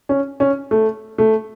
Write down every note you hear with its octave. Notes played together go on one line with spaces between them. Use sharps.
C#4
C#4
A3
A3